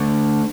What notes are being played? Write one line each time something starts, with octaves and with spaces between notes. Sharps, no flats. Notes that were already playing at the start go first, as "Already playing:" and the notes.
Already playing: D2 D3 A3